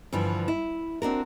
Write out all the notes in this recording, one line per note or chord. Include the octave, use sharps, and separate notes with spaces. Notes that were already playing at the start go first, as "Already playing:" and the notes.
G2 D3 E3 F3
E4
C4 D4 F#4 A#4